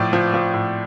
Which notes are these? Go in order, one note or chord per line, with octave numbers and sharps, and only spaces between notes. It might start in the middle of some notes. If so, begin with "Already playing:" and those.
Already playing: A2 F3 D5
F3
F3
A2